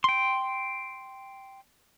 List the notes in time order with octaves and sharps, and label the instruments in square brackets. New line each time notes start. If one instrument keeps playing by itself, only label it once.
[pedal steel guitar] G5 C6